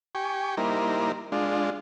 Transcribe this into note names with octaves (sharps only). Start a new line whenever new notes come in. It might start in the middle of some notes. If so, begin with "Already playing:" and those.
G4 G5 G#5 C#6
G3 A#3 D#4 E4 A#4 C5
G#3 D4 F4